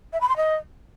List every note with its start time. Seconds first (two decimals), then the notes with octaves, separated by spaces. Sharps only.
0.13 E5
0.21 B5
0.29 C6
0.37 D#5